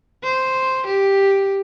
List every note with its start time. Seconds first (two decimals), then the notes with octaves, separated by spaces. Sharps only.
0.24 C5
0.86 G4